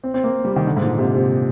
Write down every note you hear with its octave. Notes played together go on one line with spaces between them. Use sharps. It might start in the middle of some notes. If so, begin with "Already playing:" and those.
C4
C4
A#3
G3
D#3
D3
G#2
A#2
C3
C3